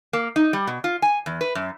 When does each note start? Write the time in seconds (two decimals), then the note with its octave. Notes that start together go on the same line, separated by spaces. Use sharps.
0.13 A#3
0.36 D#4
0.53 G3
0.67 B2
0.84 F4
1.02 G#5
1.26 E2
1.41 B4
1.55 F#2